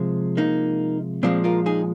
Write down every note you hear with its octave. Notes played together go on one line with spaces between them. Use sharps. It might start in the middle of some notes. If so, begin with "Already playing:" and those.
Already playing: C3 F3 G#3
A#3 D#4
A#2 F3 G#3 C4
F4 A#4
D#4 G#4